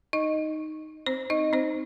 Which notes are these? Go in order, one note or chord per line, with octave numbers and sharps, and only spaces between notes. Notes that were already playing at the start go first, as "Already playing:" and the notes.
D#4 D#5
C4 C5
D#4 D#5
C4 C5